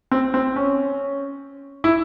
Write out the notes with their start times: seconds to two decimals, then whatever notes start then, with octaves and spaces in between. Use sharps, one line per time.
0.12 C4
0.34 C4
0.56 C#4
1.84 E4